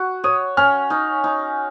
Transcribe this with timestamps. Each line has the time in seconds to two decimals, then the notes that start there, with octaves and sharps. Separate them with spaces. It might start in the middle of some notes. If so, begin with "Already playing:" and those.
Already playing: F#4
0.24 C#5 D#6
0.57 C#4 F6
0.90 D#4
1.24 D#4